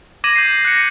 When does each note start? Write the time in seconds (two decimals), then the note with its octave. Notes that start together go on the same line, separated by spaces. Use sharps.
0.24 D6 G#6 A#6 D#7 F#7
0.36 G6 C7
0.65 F#6 A#6 C#7